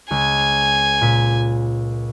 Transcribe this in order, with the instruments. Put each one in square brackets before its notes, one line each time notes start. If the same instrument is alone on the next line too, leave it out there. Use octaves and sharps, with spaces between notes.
[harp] C#2 [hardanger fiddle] G#5
[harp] A#2 B6